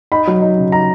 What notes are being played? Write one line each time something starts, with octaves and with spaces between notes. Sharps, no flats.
D#4 B5
F#3
D#4
C#3
D#4 A#5